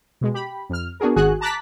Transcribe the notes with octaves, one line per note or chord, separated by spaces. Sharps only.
B2 G#3
G4 B5
F2 F6
B3 D4 F#4 G#4 A#4
G#1 D#3 F#4 G#4 G#5 F#6
A5 A#5 D6 F#6 A6 B6